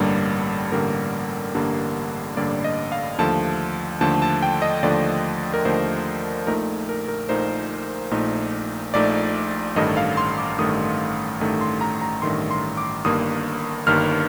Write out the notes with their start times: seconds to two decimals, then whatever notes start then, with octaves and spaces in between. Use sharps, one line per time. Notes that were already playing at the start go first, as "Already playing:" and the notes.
Already playing: A1 G2 D3 G3 A#3
0.72 A1 G2 D3 G3 A#3 A#4
1.55 A1 G2 D3 G3 A#3
2.36 A1 G2 D3 G3 A#3 D5
2.64 D#5
2.92 F5
3.18 D#2 D3 F3 A3 A5
4.01 D#2 D3 F3 A3 A5
4.22 A5
4.43 G5
4.62 D#5
4.82 D#2 D3 F3 A3 D5
5.54 A#4
5.65 D#2 D3 F3 A3 C5
6.47 A#1 A#2 A3 D#4 A#4
6.89 A#4
7.08 A#4
7.29 A#1 A#2 A3 D#4 C5
8.11 A#1 A#2 A3 D#4
8.94 A#1 A#2 A3 D#4 D5
9.76 A1 G2 D#3 A3 D#5
9.97 F5
10.17 C6
10.38 D6
10.58 A1 G2 D#3 A3 D#6
11.40 A1 G2 D#3 A3
11.61 C6
11.81 A#5
12.01 A#5
12.22 A1 G2 D#3 A3 C6
12.51 C6
12.77 D6
13.05 G1 G2 D#3 A#3 D#6
13.86 G1 G2 D#3 A#3 F6